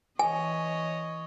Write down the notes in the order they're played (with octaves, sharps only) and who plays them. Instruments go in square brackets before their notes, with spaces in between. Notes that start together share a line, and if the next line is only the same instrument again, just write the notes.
[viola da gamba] E3 C#5 D#5 [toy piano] G#5